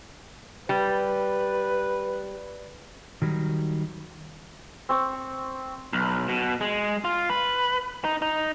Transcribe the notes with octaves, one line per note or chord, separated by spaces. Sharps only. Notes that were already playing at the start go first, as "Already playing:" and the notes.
G3 B4
D#3 F#3 G3
C4 C#6
B1
B2
G#3
F4
B4
D#4
D#4